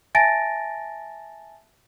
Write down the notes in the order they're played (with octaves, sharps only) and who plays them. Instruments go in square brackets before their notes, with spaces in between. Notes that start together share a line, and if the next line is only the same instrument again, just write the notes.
[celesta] E5 G#5 A5 A6 A#6 D7